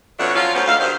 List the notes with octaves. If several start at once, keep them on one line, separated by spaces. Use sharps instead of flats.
F2 B2 A3 D4 C#5 F#5
F3 F#3 C#4 F4
D2 B3 C#4 A#4 C5
D2 G#3 E5 F5
G2 D#3 C5